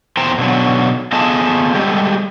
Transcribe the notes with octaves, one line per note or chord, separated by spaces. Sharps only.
E2 D#3 C5 G5 A#5
B2 D3 F#3
B3 F4 G#4 A4 D#5 A5
G3 G#3 G4 A4